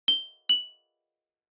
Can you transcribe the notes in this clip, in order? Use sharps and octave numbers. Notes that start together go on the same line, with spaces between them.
G7
F#7